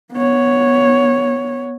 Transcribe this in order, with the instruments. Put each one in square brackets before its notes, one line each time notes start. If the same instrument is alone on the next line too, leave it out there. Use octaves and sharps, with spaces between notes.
[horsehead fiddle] B3 C#5